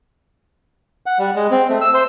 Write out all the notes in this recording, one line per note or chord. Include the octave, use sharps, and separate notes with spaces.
F#5
G3
G#3
C4
A3
E6
C5